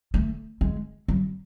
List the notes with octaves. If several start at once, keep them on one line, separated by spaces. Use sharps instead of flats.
A3
G#3
F#3